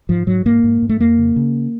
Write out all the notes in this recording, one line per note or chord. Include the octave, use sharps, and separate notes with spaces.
G#2 F3
G#2 F#3
G#2 A#3
G#2
G#2
A3
F2 A#3
C#3
C#3